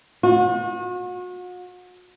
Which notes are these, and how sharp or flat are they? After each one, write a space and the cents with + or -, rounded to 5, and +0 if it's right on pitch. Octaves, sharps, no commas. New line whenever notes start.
F#4 -40